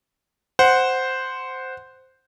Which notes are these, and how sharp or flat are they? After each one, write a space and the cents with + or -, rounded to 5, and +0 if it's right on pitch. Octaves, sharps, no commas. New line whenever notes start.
C5 -5 F#5 +0